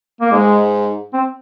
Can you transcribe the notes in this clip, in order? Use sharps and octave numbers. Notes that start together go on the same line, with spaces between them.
A#3
G#2 G#3
C4